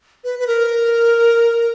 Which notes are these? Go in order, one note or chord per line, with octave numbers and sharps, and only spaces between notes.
B4
B4
A#4